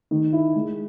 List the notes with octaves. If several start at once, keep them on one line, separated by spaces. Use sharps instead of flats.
D#3
E4
G#3